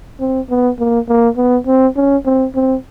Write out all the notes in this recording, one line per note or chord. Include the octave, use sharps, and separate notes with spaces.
C4
B3
A#3
A#3
B3
C4
C#4
C4
C4